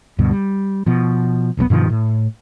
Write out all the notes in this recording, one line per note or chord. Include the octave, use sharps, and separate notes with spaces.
D2 G2 B2
G3
B2 F3
F1 B1 A#2 B3
G2 B2 D#3 F3
A2